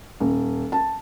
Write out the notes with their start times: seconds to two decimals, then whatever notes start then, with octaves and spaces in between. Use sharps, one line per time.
0.20 D#1
0.72 A5